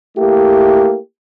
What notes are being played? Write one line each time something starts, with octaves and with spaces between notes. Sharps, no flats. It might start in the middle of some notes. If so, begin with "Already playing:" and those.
A3 A#3 E4 G4